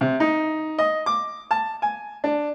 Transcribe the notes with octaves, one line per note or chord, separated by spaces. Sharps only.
C3
D#4
D#5
D6
A5
G#5
D4